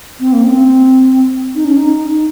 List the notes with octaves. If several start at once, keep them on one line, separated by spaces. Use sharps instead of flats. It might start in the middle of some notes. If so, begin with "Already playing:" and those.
C4
A#3
C#4
C4
D#4
C#4
D#4